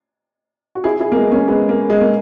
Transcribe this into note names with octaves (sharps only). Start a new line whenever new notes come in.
F#4
E4 G#4
E4 G#4
A#3
G#3 B3
A#3 C#4
G#3 B3
A#3
G#3
A#3